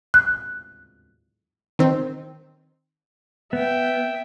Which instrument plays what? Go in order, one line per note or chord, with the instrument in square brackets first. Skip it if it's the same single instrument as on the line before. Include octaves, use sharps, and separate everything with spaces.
[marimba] F#6
[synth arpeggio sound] D#3 C4
[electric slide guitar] B3 [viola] E5 G5